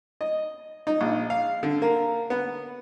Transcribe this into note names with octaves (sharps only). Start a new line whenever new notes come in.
D#5
D#4
A#1
F5
D3
A#3
B3